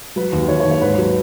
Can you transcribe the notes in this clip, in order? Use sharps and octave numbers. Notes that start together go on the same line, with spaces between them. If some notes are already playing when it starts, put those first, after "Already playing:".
F#3 B4
D#2
D#3 C#5
C#5
D#2
C#5
G#2 B4
F#3